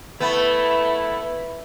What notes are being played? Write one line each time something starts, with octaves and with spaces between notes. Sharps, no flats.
A3 B3 E4